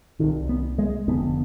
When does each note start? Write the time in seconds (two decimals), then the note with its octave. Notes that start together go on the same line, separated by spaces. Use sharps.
0.19 C2 C3 D#3
0.49 B3
0.78 G#3
1.08 F1 F2 D3 B3